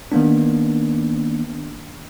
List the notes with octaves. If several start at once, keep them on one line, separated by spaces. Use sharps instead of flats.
D#3 A#3 B3 D4